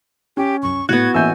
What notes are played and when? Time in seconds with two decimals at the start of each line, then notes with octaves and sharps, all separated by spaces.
0.37 C#4 G4
0.63 C2 F#2 C#6
0.89 A2 B3 E4 F#4 F#6 G#6
1.14 A1 A#3 E5 G#5 E6 G6